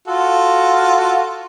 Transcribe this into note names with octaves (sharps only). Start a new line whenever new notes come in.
F4 F#4 A4